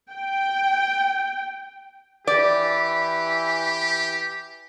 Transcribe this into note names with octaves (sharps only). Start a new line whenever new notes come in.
G5
E3 G4 D5